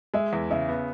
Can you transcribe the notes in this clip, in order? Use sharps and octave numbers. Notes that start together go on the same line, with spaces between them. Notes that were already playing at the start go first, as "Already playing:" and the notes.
G#3 E5
E2
C#3 E5
B3